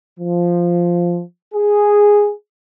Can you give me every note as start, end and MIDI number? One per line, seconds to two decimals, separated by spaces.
0.20 1.21 53
1.54 2.31 68